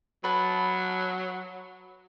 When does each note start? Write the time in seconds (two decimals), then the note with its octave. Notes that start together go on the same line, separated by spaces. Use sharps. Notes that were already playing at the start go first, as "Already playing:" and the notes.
0.24 F#3 B4 A5